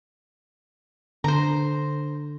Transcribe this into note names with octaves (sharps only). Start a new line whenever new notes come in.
D3 C5 A#5